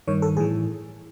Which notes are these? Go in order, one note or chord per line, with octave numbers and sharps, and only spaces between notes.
G2 D#3 C#5
A4
A2 E3 G#4